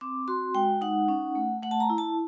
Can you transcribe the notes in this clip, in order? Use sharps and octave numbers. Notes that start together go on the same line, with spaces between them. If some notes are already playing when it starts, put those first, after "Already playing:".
C4 D6
F#4 C6
G#3 G5
D#4 F#5
C#4
A3
A3 F#5
A5
A#5
E4
A5